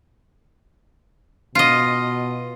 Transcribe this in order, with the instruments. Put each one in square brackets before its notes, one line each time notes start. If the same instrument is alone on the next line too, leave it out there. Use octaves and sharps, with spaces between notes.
[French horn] B2 [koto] F4 D#5